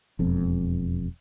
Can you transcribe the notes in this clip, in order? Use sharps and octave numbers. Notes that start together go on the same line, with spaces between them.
E1 F2